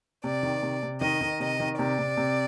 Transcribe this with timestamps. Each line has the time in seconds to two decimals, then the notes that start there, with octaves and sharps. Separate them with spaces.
0.24 C3 D5
0.43 D#3
0.63 C3
0.83 C3
1.01 D#3 D#5
1.21 D#3
1.40 C3 D#5
1.60 D#3
1.79 C3 D5
1.99 C3
2.17 C3